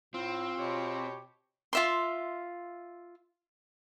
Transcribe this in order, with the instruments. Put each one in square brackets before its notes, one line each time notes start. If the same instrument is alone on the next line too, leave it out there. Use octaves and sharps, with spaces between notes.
[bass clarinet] A2 [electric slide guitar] C4 [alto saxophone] F4
[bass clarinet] B2 [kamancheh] G4 C#5
[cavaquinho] F4 E5 C6